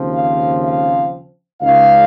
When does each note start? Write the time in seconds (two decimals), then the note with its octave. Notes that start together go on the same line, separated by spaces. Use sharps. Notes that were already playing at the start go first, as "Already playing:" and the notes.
Already playing: D#2 C#3 F3 C4
0.14 F5
0.63 F5
1.61 C#2 C#3 G#3 D#4 F5